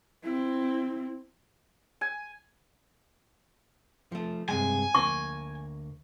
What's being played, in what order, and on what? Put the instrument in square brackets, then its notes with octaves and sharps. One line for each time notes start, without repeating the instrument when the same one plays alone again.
[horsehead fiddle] C4 E4
[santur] G#5
[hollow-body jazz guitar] F3 A3
[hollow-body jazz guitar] G2 C3 G#3 [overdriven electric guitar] G#5
[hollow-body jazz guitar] D2 A#3 [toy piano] C#6